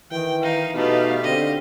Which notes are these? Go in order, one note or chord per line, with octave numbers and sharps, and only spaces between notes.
D#3 E3 G5
D#4 F5
B2 A3 B3 D#4 G4 F5
D3 C4 D#5